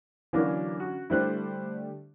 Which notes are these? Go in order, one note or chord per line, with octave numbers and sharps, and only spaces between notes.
D3 E3 F#3 A#3 C#4 D4
F#4
D3 G3 A3 E4 C5 F#6